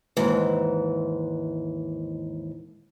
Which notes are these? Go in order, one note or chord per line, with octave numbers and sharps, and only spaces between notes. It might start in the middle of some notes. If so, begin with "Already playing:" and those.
D#2 G#2 E3